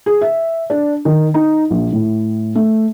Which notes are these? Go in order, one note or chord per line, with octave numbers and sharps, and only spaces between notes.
G#4
E5
D4
D#3
D#4
A#1
A2
A3